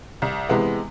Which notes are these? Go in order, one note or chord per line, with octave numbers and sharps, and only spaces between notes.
C2
C3 E3 G#3 B3